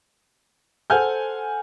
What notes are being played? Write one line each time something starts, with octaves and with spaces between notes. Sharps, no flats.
A4 C5 F#5 G#5 F6 G6